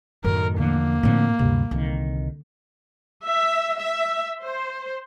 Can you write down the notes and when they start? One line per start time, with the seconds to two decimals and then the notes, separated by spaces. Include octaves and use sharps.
0.24 F#2 A2 D#3 A#4
0.58 E2 D3 F3 A#3
1.03 A2 D3 F3 C4
1.39 D2 G2 C3
1.71 C2 D3 D#3
3.24 E5
3.79 E5
4.41 C5